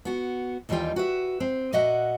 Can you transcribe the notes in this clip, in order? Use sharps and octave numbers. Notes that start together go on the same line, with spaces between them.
B3 F#4
D#2 E3 G3 D#4 F4 G5
F#4 B4 E5
C4
A#2 F#4 D#5 E5 F#5